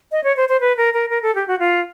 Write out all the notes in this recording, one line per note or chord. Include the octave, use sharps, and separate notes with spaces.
D#5
C#5
C5
C5
B4
A#4
A#4
A#4
A4
G4
F#4
F4